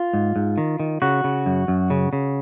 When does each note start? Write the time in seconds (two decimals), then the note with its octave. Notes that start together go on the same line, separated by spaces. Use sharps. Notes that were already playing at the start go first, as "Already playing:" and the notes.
Already playing: F4
0.13 G#2
0.36 G#2
0.58 D#3
0.80 D#3
1.02 C#3 F#4
1.24 C#3
1.46 F#2
1.68 F#2
1.90 C#3
2.13 C#3